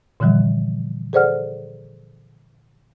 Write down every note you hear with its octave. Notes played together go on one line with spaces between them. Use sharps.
A#2 D3 E3 F3 G3
G#4 A4 C5 D5 F#5 F6